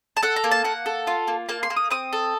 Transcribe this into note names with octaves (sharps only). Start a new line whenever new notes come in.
A5
A4 F#5
A#5
A#3
A5
A#3 F#5
A4
F4
A#3
A#3 A5
C6
A#3
D#6
C4 D#6
A4